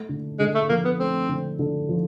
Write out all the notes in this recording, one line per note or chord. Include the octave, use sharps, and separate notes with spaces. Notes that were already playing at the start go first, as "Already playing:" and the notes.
Already playing: A3
D3
D3 G#3
A3
F3 A#3
B3
A3 C4
D3
D3
F3